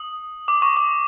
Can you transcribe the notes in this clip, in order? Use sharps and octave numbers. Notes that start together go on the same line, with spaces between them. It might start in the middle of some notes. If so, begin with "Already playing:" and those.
Already playing: D#6
D6
C#6
D6